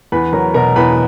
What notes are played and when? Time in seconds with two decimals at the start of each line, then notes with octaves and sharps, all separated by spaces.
0.12 E2 B4 B5
0.33 F#3 A#4 A#5
0.54 B2 A#4 A#5
0.76 E2 B4 B5